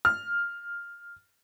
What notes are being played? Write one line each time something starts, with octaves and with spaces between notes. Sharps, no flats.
F6